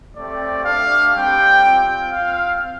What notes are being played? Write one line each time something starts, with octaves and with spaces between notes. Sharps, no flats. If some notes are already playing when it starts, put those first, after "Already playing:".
A3 C4 G4 D5
A3 D4 G4 F5
G3 C4 G4 G5
C4 F4
C4 F4 F5